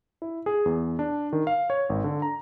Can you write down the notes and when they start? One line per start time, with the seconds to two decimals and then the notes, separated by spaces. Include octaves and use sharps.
0.22 E4
0.46 G#4
0.66 E2
0.99 D4
1.33 D#3
1.47 F5
1.70 C#5
1.90 G#1
2.04 D3
2.22 A#5